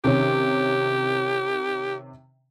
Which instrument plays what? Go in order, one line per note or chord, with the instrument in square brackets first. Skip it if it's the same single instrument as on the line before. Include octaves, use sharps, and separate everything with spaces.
[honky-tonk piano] C3 D#3 C#4 [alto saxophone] G4